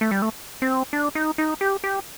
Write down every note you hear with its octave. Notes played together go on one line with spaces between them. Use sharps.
A3
G3
A3
C4
D4
D#4
D#4
G4
G4